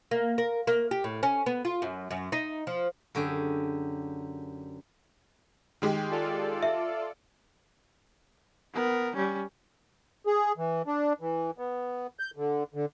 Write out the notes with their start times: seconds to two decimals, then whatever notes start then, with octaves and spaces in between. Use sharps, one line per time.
0.11 A#3
0.38 A#4
0.67 A#3
0.91 G4
1.04 A2
1.23 C#4
1.46 B3
1.65 F4
1.82 F#2
2.11 F#2
2.32 D#4
2.67 F3
3.15 F#2 D3 G4 G#4
5.82 D#3 G#3 G4
6.11 F4 A4 D5
6.63 E5
8.74 B3 A#4
9.16 G3 C#4
10.26 G#4
10.58 E3
10.87 D4
11.21 E3
11.58 B3
12.19 G6
12.37 D3
12.74 D3